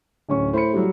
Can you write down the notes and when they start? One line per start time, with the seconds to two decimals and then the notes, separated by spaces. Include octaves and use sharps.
0.29 D1 C#4 C#6
0.53 A2 C5 B5 C#7
0.74 F#3 G3